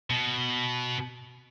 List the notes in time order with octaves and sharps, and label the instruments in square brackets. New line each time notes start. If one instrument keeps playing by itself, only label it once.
[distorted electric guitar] B2